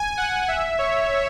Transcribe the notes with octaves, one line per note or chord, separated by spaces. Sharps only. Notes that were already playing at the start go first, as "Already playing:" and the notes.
Already playing: G#5
F#5
E5
C#5